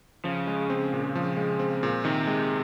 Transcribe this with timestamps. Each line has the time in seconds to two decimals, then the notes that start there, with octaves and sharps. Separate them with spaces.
0.24 C#3 F3
0.47 G#3
0.70 C4
0.93 A#2
1.15 F3
1.37 G#3
1.59 C4
1.83 A#2
2.05 C3 D#3
2.27 G#3